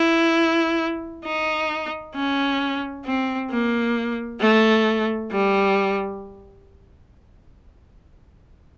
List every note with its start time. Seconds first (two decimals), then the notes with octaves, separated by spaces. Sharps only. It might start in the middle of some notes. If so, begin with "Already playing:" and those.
Already playing: E4
1.25 D#4
2.15 C#4
3.06 C4
3.50 A#3
4.40 A3
5.31 G3